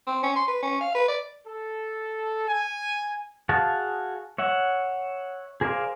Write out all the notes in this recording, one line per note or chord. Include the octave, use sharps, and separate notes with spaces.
C4
C#4
C6
B4
C#4
F5
B4
D5
A4
G#5
F#4 G#4 F5 A5
C#5 E5 F#5
G#4 A#4 C5 D5 F5